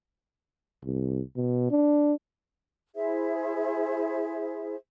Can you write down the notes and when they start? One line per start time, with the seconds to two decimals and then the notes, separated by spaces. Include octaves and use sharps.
0.84 C2
1.36 B2
1.71 D4
2.95 E4 G#4 C5 E5